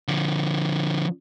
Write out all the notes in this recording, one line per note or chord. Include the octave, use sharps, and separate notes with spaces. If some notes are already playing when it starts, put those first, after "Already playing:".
D3 F3